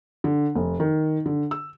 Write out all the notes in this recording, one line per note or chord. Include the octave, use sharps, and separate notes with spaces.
D3
F1
D#3
D3
E6